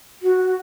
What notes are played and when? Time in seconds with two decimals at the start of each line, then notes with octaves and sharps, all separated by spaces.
0.22 F#4